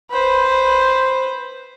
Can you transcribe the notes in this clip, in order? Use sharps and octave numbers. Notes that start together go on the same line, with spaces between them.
B4 C5